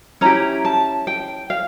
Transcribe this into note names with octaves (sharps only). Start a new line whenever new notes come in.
C#4 E4 G4 A#5
A5
G5
F5